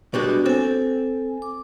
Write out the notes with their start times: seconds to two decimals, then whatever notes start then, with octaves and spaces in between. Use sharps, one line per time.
0.14 B2 G3 G#3 D4 F#4
0.46 C4 A4 G#5
1.42 D6